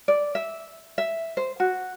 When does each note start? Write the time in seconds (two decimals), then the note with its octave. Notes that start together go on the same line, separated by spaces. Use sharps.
0.08 D5
0.35 E5
0.98 E5
1.37 C5
1.60 F#4